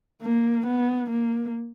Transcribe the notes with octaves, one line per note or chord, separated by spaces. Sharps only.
A#3
B3
A#3